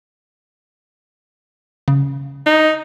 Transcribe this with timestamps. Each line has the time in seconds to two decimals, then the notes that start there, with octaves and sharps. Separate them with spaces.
1.88 C#3
2.46 D#4